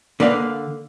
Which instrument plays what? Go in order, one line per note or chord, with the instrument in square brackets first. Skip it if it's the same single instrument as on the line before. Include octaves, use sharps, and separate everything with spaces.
[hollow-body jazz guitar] D3 A#3 B4 D5 F5